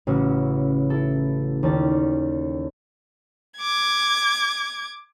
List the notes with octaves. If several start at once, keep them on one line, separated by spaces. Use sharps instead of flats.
A1 C#3 C#4 F#4 E6
E4 A4
D#2 C#4 D5 A5
D6 G#6